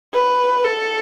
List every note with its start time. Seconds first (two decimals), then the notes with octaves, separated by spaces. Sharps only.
0.14 B4
0.64 A4